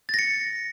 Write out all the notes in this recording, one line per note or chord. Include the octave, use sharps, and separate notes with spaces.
A6 A#6 C#7